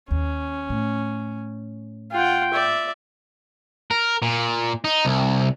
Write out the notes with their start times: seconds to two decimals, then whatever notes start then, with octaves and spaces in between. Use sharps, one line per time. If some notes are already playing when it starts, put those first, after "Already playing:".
0.11 D#2 C#4
0.70 A2
2.12 F4 F#5 G5
2.53 D5 E5
3.91 A#4
4.22 A#2
4.84 D#4
5.05 C2